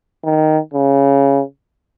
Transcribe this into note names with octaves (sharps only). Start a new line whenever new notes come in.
D#3
C#3